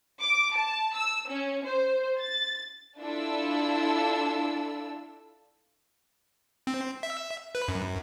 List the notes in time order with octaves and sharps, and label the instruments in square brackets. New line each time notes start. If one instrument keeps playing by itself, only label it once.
[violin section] D6
A5
E6
C#4
C5
A6
D4 E4 F4 A4 E6
[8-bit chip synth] C4
E5
B4
F#2